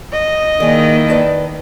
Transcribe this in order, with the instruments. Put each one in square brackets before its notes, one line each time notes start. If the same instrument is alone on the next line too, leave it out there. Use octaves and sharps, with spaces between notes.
[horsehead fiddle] D#5
[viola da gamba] D#3 E4 [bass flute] A#3 [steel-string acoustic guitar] G#4 D5
[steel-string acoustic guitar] B4 D5 A5